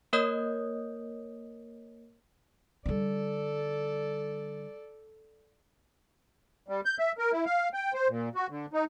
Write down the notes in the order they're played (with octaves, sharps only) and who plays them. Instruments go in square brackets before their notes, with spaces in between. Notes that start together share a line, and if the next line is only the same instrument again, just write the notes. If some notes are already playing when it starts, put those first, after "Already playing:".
[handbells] A#3 A#4 C#5 D#5 D#6 G6
[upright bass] D3 G3 [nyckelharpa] A4 D5
[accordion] G3
G6
E5
A#4
E4
F5
G5
C5
A#2
F#4
D3
D#4